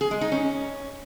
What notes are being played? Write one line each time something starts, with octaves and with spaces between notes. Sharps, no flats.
G#4
G#3
D#4
C#4